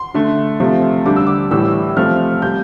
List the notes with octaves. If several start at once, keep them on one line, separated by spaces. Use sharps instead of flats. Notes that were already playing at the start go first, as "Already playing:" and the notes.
Already playing: C6
D3 A3
C3 F3 A3
D3 G3 D6
E6
D6
A2 E3 G3 E6
C3 F3 A3 F6
C3 G3 G6